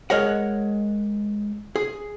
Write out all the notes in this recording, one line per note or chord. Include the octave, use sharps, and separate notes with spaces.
G#3 A#4 C#5 D#5 F#5
G#4